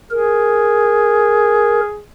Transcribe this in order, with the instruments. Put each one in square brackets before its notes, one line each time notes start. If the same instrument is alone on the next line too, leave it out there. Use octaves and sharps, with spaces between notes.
[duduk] G#4 [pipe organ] A#4